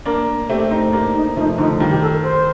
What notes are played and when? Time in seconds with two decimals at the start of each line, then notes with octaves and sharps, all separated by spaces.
0.06 A#3 D4 A#4
0.49 A3 C4 G4
0.71 C4 D#4
0.92 A#3 D4 G4
1.15 D#4
1.37 F3 A3 D#4
1.58 D3 F3 D#4
1.80 D#3 G3 F4
1.90 G4
2.02 A4
2.13 A#4
2.23 C5